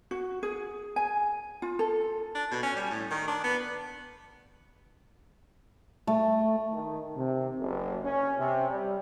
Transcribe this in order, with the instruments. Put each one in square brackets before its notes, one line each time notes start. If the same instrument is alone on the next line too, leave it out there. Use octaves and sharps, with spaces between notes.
[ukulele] F#4
G#4
G#5
F4
A4
[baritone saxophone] D4
B2
C#4
G3
A2
D#3
D4
B3
[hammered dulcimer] A3
[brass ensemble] D#3
C3
F#1
C#4
C3
G3